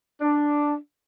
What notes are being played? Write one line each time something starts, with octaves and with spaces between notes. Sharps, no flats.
D4